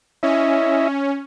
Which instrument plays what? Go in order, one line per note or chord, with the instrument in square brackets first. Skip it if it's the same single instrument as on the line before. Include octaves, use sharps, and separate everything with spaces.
[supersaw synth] C#4 [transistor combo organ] E4 D#5 E5